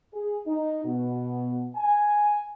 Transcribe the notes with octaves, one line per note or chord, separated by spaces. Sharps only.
G#4
D#4
B2
G#5